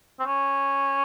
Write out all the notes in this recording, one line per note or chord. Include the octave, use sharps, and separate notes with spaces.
C4
C#4